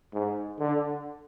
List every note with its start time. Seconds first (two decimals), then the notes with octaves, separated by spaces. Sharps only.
0.13 G#2
0.59 D3